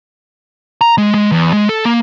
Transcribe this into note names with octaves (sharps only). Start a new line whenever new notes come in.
A#5
G#3
G#3
E2
G#3
A4
A#3